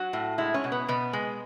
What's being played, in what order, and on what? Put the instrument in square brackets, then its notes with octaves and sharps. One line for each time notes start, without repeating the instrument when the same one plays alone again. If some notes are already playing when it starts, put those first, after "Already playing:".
Already playing: [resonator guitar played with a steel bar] F#3 F#4
A2
G#3 E4
C#4
B2
B3
B2 B3
G#3